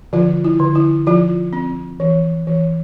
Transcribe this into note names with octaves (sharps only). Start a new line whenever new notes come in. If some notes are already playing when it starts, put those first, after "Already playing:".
D3 F3 F4
E4
D3
E4
F3 F4
C4
E3
E3